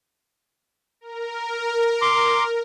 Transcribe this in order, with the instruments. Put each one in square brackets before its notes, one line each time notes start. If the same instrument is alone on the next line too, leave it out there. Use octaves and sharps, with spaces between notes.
[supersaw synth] A#4
[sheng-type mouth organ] C6 D6